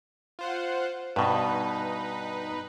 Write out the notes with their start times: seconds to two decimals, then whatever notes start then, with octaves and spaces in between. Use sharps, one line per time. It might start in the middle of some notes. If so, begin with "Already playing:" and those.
0.39 F4 C5 F#5
1.16 G2 B2 D#4 B4